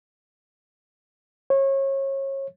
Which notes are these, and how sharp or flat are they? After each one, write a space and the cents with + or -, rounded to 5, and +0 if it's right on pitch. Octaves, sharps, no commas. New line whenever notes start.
C#5 -30